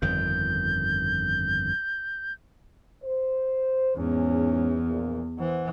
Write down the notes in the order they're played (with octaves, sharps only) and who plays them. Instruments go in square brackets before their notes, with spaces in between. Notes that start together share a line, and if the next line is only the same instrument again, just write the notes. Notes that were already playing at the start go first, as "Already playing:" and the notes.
[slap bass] G1 F2 D#3 [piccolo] G6
[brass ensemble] C5
[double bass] E2 [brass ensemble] G#2 C#4
[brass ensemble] A#1 A#2
[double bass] E3 [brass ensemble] C5 F#5